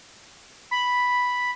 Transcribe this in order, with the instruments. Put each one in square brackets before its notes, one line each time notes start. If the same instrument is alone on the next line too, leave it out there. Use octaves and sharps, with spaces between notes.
[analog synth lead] B5